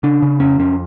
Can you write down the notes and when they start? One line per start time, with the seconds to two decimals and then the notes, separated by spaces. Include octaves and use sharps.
0.03 C#3 D4
0.22 C#3
0.40 F2 C#4
0.59 F2 C#4